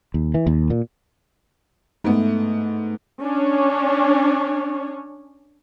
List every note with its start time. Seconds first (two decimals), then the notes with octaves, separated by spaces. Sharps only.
0.14 D#2
0.34 E3
0.46 D#2
0.70 A#2
2.04 G#2 A3 B3
3.21 C#4 D4 C#5